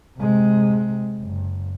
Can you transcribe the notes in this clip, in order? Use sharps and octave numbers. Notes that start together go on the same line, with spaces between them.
C3 G#3
F#1